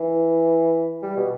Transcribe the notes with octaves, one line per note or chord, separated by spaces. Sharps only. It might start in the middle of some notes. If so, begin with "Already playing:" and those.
Already playing: E3
G3
B2